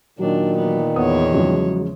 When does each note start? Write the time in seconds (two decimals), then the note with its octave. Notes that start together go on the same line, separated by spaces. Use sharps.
0.19 A#2 D#3 F#3 D4
0.56 E3 B3
0.96 E2 B3 C#5 D#6
1.32 C#3 F3 F#3 G#3